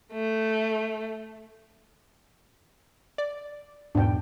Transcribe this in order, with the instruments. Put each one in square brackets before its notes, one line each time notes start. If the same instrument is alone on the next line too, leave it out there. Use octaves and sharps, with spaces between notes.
[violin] A3
[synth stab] D5
[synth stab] E2 G#2 B2 [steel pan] D4 G5